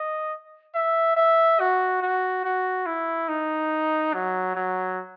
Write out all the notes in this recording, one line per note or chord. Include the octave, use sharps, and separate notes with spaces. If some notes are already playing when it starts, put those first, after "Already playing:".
Already playing: D#5
E5
E5
F#4
F#4
F#4
E4
D#4
F#3
F#3